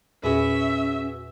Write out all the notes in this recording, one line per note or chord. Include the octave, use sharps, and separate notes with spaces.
E2 A#2 C#4 F#4 G#4 B4 E5